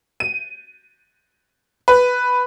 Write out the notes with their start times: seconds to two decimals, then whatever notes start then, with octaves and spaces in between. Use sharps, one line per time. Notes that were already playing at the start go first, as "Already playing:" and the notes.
0.20 D#7
1.88 B4